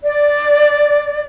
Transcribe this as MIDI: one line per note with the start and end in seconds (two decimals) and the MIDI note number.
0.03 1.25 74